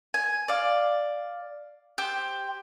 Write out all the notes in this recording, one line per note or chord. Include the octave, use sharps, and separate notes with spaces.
G#5
D5 F5
G4 C5